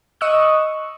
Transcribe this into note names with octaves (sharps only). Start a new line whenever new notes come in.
D#5 C#6 D#6 E6 F#6